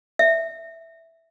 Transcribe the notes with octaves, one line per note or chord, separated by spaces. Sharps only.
E5